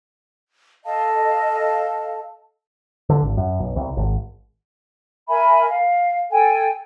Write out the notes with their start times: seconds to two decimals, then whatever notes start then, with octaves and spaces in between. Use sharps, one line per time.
0.84 A4 D#5 F5 A5
3.09 D3
3.22 G#1
3.37 F#2
3.59 B1
3.76 C2
3.97 G#1
5.28 A#4 E5 G#5 B5
5.67 F5
6.31 A4 G5 G#5